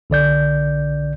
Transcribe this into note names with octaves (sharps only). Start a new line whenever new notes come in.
B1 D3 D5 G6